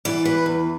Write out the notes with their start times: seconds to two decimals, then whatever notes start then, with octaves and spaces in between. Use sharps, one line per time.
0.05 E3 D5
0.25 B4
0.46 E2